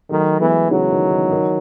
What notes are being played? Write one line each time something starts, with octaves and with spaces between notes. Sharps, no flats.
D#3 F#3 A3
E3 G#3 B3
C#3 E3 F#3
D#3
D#3
D#3